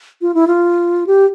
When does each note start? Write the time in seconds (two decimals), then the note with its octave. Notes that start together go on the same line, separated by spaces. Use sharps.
0.21 F4
0.34 E4
0.47 F4
1.07 G4